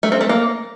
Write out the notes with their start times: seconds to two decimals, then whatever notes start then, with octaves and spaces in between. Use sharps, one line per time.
0.03 A3
0.12 C4
0.21 A3
0.29 A#3